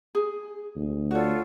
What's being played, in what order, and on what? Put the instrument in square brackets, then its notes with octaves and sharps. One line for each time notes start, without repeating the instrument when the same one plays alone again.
[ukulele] G#4
[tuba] D2
[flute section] F4 A4 D5 [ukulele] F#4 C#5